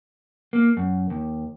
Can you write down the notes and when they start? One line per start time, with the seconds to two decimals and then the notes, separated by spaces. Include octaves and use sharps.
0.53 A#3
0.77 F#2
1.10 D#2